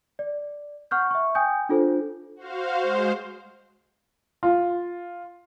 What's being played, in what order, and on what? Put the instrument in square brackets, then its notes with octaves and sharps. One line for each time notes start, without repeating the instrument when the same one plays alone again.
[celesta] D5
F#5 C#6 F6 G6
E5 C#6
G5 G#5 D#6 G6
D4 F4 A4 C5
[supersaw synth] F#4 C5 F5
G#3 C5
[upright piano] F4